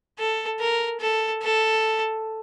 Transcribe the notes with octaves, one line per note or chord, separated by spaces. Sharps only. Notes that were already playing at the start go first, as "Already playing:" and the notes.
A4
A#4
A4
A4